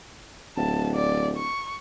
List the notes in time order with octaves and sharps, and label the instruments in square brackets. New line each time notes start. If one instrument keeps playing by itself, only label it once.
[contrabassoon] D1 [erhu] A5
[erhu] D5
C#6